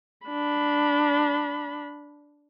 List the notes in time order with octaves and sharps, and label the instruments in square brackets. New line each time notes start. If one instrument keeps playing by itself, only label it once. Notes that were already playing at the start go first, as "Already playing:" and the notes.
[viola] D4 B5